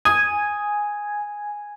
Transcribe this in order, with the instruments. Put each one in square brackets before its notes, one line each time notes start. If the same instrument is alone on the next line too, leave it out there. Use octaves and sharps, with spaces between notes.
[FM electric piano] G#5 [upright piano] D#6